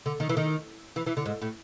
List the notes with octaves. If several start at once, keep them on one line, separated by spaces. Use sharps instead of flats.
D3
D#3
E3
D#3
E3
E3
D3
G#2
A2